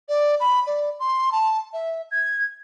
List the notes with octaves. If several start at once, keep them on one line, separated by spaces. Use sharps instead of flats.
D5
B5
D5
C6
A5
E5
G#6